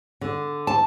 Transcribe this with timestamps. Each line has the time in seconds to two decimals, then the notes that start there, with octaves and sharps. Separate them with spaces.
0.21 D3
0.67 A5